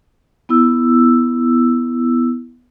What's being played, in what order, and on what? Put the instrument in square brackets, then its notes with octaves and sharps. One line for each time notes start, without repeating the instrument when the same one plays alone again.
[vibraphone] B3 E4 E6